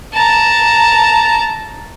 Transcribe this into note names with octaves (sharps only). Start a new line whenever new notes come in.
A5 A#5